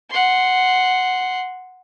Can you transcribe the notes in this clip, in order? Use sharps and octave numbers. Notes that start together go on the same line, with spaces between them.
F#5 C6